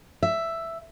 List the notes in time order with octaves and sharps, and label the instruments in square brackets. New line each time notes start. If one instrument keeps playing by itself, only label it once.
[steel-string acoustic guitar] E5